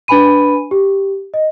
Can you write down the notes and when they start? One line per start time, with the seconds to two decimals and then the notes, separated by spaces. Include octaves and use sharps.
0.08 D4 B4 G#5 B5 D#7
0.71 G4
1.34 D#5